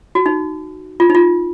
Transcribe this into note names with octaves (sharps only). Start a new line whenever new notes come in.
F#4
D#4
F4
D#4
F4